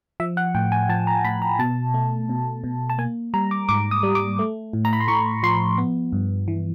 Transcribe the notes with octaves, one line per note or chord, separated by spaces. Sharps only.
F3 E5
F#5
A2 G5
G#5
F3 A5
A#5
A2 B5
A#5
B2 A5
A3
B2
B2
A5
A#3 G#5
G3 A#5
D6
G#2 D6
D#6
G3
D6
A3
A2
A#5
B5
C6
A2 C#6
F3 C6
B3
G2
E3